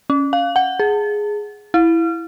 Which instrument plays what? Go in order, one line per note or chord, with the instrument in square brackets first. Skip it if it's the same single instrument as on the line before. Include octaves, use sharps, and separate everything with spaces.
[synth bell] C#4
F5
F#5
G#4
E4